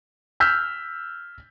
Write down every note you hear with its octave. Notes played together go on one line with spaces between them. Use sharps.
E6 F6 G6 B6